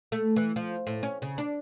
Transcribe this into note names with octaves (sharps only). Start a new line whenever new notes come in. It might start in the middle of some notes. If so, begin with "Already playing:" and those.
A3
E3
F3
A2
C#4
C#3
D4